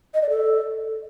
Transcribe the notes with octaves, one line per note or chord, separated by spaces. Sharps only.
D#5
D5
A4